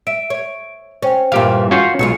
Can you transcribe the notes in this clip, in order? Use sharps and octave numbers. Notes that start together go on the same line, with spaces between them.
E5 D7
C#5
C#4 C5 G5
G2 A#2 E3 G4 F5
C#4 F4 F#4 G6 C7 C#7
B1 F#3 G#3 F4 C#7